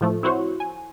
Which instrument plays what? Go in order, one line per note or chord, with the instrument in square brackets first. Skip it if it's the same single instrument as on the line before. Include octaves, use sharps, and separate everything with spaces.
[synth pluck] A2 F3 A3
C4 E4 F#4 C5 C#5
G#5